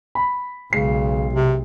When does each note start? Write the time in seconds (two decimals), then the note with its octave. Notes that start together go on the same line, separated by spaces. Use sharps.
0.15 B5
0.73 B1 C#3 G#3 C7
1.33 C3